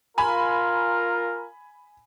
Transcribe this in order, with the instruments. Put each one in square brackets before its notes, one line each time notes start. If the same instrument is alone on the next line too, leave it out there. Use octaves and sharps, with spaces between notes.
[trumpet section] F4 A#4 [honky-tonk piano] G#5 B5